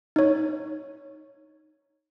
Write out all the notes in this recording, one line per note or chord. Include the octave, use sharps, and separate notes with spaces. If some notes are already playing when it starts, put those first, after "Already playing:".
D#4 C#5